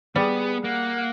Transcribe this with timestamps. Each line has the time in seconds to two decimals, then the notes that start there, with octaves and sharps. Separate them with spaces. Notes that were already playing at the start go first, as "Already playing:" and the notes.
0.16 G3 B3 G#4
0.64 A#3 F#5